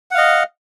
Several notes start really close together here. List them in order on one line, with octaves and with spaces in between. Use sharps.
F#5 F5 D#5